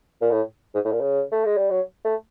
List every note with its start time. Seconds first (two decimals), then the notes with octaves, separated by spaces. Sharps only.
0.21 A#2
0.31 A2
0.75 G#2
0.85 A2
0.93 A#2
1.01 C#3
1.32 A3
1.45 G#3
1.58 G3
1.70 F#3
2.05 A3